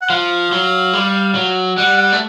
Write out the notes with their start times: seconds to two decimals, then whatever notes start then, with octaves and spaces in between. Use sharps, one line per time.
0.02 F#5
0.10 F3 F5
0.52 F#3
0.93 G3
1.35 F#3
1.78 G3 F#5
1.97 F#5
2.12 A3